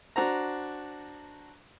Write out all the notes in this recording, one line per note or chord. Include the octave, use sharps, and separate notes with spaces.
D4 F#4 C5 A#5